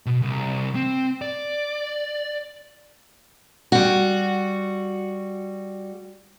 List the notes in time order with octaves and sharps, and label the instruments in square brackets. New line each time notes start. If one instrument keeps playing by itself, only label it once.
[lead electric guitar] B2
C2
C4
D5
[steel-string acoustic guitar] G3 F#4